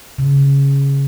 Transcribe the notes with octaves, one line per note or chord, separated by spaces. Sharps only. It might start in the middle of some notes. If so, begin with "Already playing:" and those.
C#3